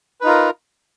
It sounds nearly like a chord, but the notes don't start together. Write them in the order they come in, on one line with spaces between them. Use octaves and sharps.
B4 D#4 F4 A#4